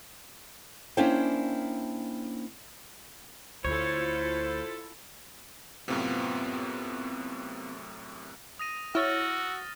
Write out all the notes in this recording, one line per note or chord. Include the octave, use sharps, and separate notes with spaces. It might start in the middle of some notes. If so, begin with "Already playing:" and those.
A#3 C#4 D4 E4 C5 G5
D2 E4 F4 A4 C5 C#5
F#2 A2 C3 B3 C4 F4
D#6 A#6 D#7
E4 F#4 C#5 E6 F6 A6